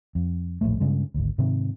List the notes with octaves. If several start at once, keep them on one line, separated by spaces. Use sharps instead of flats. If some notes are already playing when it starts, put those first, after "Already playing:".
F2
D#1 A#1 A2 A3
G2 C#3 G#3
G#1 D2
G#2 C3 D#3